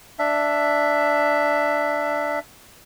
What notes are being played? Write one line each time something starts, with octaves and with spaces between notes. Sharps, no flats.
D4 E5